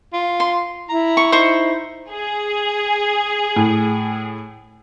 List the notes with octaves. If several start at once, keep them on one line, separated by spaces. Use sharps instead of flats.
F4
C6
E4 A#5
C#6
D#4 C5 C#6
G#4
A2